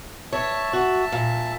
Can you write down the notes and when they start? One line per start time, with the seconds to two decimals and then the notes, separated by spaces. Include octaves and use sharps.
0.33 C#5 E5 A5
0.73 F#4
1.12 A#2